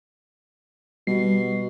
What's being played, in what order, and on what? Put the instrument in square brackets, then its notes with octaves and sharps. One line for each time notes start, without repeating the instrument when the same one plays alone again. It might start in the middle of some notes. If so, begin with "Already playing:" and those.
[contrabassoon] B2 [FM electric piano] G3 C7